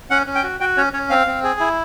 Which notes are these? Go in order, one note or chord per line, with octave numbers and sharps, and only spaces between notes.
C#4 F#5
C#4
G5
F#4
F#4 G5
C#4 C#5
C#4 C#5
C4 F5
C4
G#4
E4